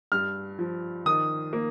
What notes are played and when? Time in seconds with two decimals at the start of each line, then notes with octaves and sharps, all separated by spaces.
0.12 G2 F6
0.59 F3
1.06 D#3 D#6
1.53 A#3